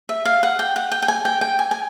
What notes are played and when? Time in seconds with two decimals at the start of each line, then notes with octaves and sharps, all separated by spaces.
0.09 E5
0.25 F5
0.43 F#5
0.59 G5
0.76 F#5
0.92 G5
1.02 G5
1.08 G#5
1.25 G5
1.41 G5
1.59 G#5
1.71 G#5